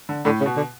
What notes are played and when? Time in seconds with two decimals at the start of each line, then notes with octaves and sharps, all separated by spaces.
0.09 D3
0.25 A2 D3
0.41 C#3
0.46 B2
0.57 D3